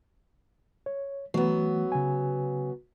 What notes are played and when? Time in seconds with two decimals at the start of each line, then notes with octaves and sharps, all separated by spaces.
0.86 C#5
1.34 E3 F#3 A3 B3
1.92 C#3 G#5